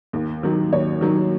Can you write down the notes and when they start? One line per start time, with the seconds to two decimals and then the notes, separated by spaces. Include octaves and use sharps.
0.13 D#2
0.43 D#3 F#3
0.73 D#2 C#5
1.01 D#3 F#3